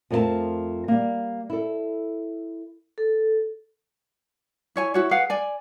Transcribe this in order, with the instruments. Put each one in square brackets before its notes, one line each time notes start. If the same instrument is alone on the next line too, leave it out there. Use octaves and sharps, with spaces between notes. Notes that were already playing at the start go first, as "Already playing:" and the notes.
[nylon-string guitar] F2 F3 A3 A4 A#4 A5
G3 A#3
E4 A4
[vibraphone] A4
[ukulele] E4 C#5 G#5
E4 F#4 C#5
G#4 B4 F5 F#5
D5 G#5